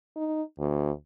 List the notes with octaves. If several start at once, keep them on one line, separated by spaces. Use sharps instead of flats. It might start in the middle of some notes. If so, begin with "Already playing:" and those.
D#4
D2